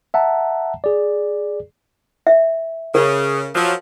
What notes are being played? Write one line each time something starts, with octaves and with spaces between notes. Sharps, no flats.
E5 F#5 A5 A#5
G#4 D5
E5
C#3 A#4
F3 F#3